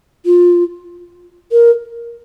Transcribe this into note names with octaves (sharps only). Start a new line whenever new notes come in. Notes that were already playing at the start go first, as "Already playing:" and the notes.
F4
A#4